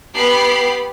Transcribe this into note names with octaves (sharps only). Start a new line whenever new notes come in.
B3 G4 B5 C7